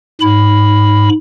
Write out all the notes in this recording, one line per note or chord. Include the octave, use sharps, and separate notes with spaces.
G#2 B5